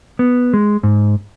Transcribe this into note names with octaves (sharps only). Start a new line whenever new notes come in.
B3
G#3
G#2